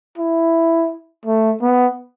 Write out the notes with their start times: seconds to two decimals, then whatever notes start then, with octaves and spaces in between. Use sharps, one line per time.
0.18 E4
1.26 A3
1.62 B3